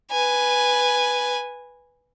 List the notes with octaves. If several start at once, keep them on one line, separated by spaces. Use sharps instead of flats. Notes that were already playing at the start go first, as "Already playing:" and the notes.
B4 G#5